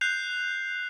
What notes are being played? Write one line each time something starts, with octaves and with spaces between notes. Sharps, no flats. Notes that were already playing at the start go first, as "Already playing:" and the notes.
F#6 G6 C7 F7